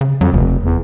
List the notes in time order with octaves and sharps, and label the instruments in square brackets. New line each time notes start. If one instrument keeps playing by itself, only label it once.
[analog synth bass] C#3
[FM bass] F2 [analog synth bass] F#3
[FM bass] F1 [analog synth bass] D#2
[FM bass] E2